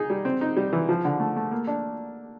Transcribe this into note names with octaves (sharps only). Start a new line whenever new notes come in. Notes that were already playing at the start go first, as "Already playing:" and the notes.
Already playing: D#4 G#4
G3
C4
D#4
G3
E3
F3
D3
A3
A3
A#3
D4